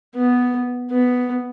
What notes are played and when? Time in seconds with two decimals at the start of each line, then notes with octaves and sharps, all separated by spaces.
0.16 B3
0.91 B3